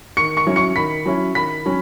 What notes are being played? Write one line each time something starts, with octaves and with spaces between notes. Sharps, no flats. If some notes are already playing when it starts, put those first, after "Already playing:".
D#3 C#6 C#7
C#6 C#7
F#3 C#4 E4
C#6 C#7
D#3 B5 B6
F#3 C#4 E4
D#3 B5 B6
F#3 C#4